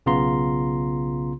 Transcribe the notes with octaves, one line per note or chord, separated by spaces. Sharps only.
B1 C#3 B3 F4 A#5 C6